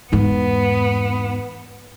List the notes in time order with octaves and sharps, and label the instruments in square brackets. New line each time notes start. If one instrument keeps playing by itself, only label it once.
[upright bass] E2 G#2 [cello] B3